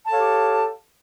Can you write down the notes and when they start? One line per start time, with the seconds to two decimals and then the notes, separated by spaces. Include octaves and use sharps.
0.05 A5
0.08 A4
0.10 F5
0.13 C#5
0.16 G4